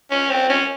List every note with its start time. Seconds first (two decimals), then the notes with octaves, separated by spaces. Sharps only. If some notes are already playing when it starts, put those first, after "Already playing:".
0.11 C#4
0.30 C4
0.49 C#4